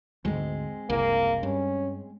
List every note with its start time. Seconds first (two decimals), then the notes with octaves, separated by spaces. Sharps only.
0.25 D2 G#2 G#3 C4
0.90 F#1 C2 A#3
1.43 G2 C#4